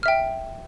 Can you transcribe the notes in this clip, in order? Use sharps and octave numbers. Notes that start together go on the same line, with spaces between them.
E5 G5 F6